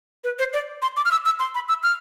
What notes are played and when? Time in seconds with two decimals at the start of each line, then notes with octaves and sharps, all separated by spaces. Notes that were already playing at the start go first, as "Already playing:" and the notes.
0.24 B4
0.39 C5
0.53 D5
0.82 C6
0.97 D6
1.05 F6
1.11 E6
1.25 E6
1.39 C6
1.55 B5
1.69 E6
1.83 F6